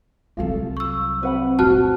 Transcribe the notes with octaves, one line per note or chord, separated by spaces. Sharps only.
C2 F#3 F4 A4
C#6 E6
C4 B4 F#5 B5
F#2 A#2 F#4 A5 F6 F#6